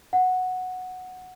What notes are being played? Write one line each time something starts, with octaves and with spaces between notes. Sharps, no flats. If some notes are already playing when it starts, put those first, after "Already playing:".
F#5